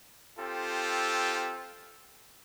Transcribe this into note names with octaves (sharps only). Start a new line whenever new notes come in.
C4 F4 G4 A4